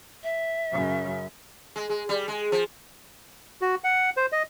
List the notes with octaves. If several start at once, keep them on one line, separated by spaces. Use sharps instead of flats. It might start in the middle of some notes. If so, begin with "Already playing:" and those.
E5
F#2 C#3
G#3
G#3
G3
G#3
F3
F#4
F#5
C5
D#5